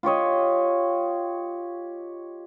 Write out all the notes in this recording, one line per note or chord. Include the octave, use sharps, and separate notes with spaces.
F4 G4 C#5 D#5